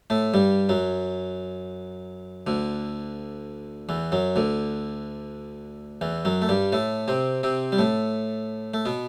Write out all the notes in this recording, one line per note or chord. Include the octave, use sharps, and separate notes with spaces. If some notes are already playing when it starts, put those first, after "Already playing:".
A2 A3
G2 G3
F#2 F#3
D2 D3
E2 E3
F#2 F#3
D2 D3
E2 E3
F#2 F#3
A3
G2 G3
A2 A3
C3 C4
C3 C4
G3
A2 A3
A3
B2 B3